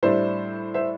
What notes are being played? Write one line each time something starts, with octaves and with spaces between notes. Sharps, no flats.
A2 G3 D4 C5 E5
C5 E5